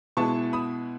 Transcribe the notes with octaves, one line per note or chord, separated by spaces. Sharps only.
B2 G#3 B3 E4 A5 C#6
B5 D#6